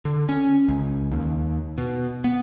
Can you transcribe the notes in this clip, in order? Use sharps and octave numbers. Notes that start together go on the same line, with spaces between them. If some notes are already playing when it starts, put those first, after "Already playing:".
D3
C#4
C#2
D#2
B2
B3